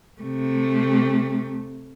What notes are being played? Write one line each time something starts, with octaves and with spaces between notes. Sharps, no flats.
C3 A3